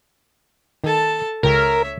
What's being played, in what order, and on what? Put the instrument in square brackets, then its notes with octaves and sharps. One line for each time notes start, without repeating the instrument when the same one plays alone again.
[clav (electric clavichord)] D#3 [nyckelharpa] A4 A5
[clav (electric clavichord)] C#2 C#3 G5 [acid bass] A#4 [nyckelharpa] C#5 E5